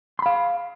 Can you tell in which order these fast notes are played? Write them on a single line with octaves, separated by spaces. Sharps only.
C6 B5 F5